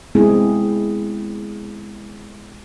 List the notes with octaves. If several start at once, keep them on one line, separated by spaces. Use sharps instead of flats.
G#3 B3 C4 E4 G#4